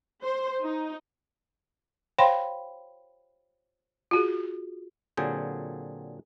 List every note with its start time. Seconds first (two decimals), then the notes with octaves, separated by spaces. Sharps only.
0.24 C5
0.63 D#4
2.18 C5 C#5 F5 G5 B5 C6
4.11 F4 F#4 G#4
5.17 A#2 D3 F#3 C4 G#4 G5